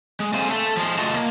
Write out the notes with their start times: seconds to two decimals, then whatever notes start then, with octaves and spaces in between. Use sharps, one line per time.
0.20 G#3
0.34 C4 A4 C5 F5 G#5
0.50 A3 A4
0.77 F3 G#3
0.98 A3 F4 F#4 D#5 A5
1.14 A#3